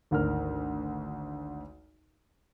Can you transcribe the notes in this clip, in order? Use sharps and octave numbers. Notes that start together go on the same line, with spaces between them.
G#1 D2 A#4 F6